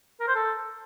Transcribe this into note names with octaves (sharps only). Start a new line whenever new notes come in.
A#4
C5
A4